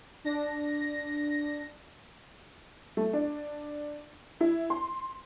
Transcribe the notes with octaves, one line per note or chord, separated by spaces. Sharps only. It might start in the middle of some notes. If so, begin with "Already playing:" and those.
D4 A#6
A3
D4
E4
C6